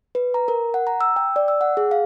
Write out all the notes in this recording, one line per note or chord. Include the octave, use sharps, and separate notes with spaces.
B4
A#5
A#4
F#5
A#5
E6
G5
D5
E6
F#5
G#4
F5